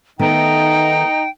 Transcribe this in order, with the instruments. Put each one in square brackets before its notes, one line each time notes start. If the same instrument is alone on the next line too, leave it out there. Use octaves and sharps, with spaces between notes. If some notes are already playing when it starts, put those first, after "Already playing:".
[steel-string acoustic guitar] D#3 A3 B3 [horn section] D#4 [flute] G5